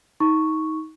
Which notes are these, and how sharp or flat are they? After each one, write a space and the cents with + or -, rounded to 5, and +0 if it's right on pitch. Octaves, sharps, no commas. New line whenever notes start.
D#4 +25 C#6 +0